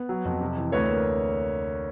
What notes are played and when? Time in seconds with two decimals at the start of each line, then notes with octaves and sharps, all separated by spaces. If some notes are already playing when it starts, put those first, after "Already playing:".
Already playing: B3
0.09 F#3
0.25 F2
0.41 C3
0.57 E3
0.72 D2 B4 C#5
0.89 A#3